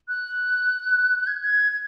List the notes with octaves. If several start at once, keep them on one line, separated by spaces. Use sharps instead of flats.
F#6
G#6
G#6
G#6